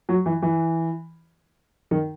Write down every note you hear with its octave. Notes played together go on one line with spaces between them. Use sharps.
F#3
E3
E3
D#3